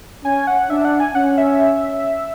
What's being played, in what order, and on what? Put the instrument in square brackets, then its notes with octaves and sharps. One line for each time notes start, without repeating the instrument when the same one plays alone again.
[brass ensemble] C#4 [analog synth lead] G#5
[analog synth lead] F#5
[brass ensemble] D4 [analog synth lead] E5
[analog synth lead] F#5
G#5
[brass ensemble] C#4 [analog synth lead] F#5
[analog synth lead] E5